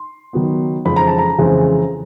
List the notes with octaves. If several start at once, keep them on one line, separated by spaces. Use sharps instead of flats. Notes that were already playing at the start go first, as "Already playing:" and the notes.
Already playing: C6
D#3 F#3 B3
F2 C#3 E3 G#3 C4 B5
A#5
A5
A#5
F2 C#3 E3 G#3 C4